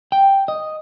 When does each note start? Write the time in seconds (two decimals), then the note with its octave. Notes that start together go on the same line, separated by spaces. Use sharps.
0.12 G5
0.48 D#5